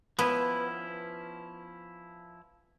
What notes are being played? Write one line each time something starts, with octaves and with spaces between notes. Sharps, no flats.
F3 B3 C#4 E4